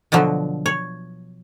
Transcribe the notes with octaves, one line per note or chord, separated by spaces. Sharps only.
B2 D3 F3 F#3
C#5